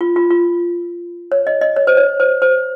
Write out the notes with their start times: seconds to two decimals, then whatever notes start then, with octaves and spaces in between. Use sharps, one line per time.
0.01 F4
0.16 F4
0.30 F4
1.32 C#5
1.47 D#5
1.61 D#5
1.76 C#5
1.87 C5
1.97 C#5
2.20 C5
2.42 C5